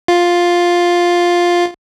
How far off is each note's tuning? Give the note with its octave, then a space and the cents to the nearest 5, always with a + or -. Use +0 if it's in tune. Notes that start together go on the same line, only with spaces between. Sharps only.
F4 +5